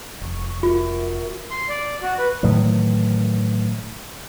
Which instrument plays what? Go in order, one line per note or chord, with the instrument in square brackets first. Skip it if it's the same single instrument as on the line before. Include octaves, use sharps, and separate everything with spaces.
[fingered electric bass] F1 [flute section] C#6
[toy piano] F4 [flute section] F#4 A#4 E5
[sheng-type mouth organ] C6
D5
F#4
B4
[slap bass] A2 D#3 E3 F#3